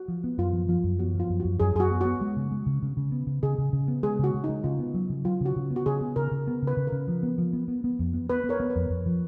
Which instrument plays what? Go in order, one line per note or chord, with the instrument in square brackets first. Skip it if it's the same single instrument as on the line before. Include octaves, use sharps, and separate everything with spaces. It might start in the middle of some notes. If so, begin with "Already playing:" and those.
Already playing: [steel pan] F#4
[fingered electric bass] F3
B3
[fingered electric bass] F#2 [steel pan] F4
[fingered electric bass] F3
[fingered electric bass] F3 [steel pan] F4
[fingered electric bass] F#2
[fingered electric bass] B3 [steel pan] F#4
[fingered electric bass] F3 [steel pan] F4
[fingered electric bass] F#2
[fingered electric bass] F#2 [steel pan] F#4
[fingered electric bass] F#2 [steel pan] G#4
[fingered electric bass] F#2 [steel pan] G#4
[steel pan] F#4
[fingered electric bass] B3
[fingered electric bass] B3 [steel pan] F#4
[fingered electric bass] G#3
C#3
G#3
C#3
C#3
C#3
B3
C#3
[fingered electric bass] C#3 [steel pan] G#4
[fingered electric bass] C#3
C#3
B3
[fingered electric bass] G#3 [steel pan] G#4
[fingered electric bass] C#3 [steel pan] F#4
[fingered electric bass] C#3
[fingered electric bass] G#3 [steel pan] D#4
[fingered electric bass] C#3 [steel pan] F4
[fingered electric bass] B3
F#3
C#3
[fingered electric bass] F#3 [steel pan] F4
[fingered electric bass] C#3 [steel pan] F#4
[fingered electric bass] C#3
B3
[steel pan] F#4
[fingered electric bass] C#3 [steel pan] G#4
[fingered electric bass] B3
[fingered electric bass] C#3 [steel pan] A#4
[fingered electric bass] C#3
B3
C#3
[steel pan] B4
[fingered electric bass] C#3
[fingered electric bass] C#3 [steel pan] A#4
[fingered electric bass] F3
B3
F3
B3
B3
B3
F2
B3
[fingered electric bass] B3 [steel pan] B4
[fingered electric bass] B3
[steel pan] A#4 C#5
[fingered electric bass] B3
[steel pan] B4
[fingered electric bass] F2
F2
F3